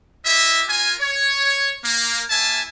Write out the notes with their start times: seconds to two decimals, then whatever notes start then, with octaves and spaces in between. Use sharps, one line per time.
0.25 E4 G4 D#5 E5
0.68 F4 A#4 G#5
1.00 C#5
1.85 A#3
2.30 A#3 E4 E5 G#5 A5